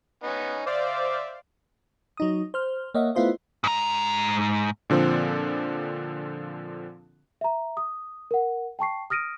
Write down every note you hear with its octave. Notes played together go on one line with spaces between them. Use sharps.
B3 C#4 D#4
C5 D5 E5 F5 D6
F#3 D#4 D#6
C5 F6
A#3 C#5 D#5 E5 F#5
A3 B3 E4 F4 C5 D#5
G#2 A#5
A#2 D3 F3 C4 A4
E5 A#5
D#6
A#4 F#5
G5 A5 C#6 C7
D#6 F6 A#6 D7 D#7